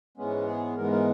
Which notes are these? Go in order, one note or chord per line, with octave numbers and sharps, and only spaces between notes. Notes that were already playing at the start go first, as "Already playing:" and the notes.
G#2 E3 G#3 B3 C#4
G#4
G#2 E3 G#3 B3 A#4
A#4